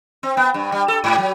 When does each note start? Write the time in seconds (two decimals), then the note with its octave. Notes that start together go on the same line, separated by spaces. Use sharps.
0.23 C4
0.37 B3
0.54 G2
0.72 G3
0.88 A4
1.04 G#2
1.18 F#3